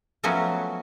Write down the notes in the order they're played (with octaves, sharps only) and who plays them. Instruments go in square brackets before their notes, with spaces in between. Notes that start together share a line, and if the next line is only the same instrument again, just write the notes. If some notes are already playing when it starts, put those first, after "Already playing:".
[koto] F3 F#3 A3 B3 C#4 F#4